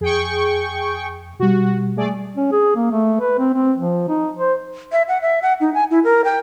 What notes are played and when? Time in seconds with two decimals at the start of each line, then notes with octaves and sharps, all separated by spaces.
0.01 F2 G#4 G5 C#6
1.39 B2 G3 F#4
1.96 A3 G#4 D5
2.37 C#4
2.52 G#4
2.76 A#3
2.92 A3
3.20 B4
3.39 C4
3.54 C4
3.78 F3
4.09 D#4
4.39 C5
4.92 E5
5.08 F#5
5.22 E5
5.42 F#5
5.60 D#4
5.74 G#5
5.91 E4
6.04 A#4
6.25 G5